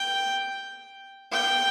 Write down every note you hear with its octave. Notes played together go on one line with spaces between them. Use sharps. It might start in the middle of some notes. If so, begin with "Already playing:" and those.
Already playing: G5
G5